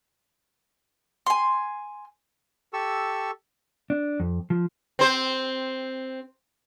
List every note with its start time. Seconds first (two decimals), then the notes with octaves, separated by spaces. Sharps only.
1.26 G#5 C6
2.73 G4 A4 C#6 E6
3.90 D4
4.20 F2
4.50 F3
4.99 C4 C5